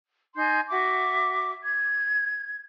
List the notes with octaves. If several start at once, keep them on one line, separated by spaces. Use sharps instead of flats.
D#4 G#5 C6 G6
F#4 E5 D6
G#6